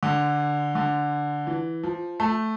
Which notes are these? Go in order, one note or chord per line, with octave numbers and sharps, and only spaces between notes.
D3
D3
E3
F3
A3